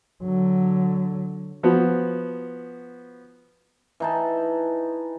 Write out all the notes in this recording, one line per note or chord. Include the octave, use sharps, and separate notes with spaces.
D3 F#3
F3 B3 F#4
E3 D#4 A5